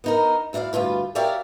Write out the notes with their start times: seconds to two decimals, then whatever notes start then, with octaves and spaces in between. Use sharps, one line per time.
0.04 B3 D#4 A#4
0.53 D2 E4 B4 D5 F5
0.73 D2 G2 F4 B4
1.15 G4 A#4 C#5 D5 E5 F5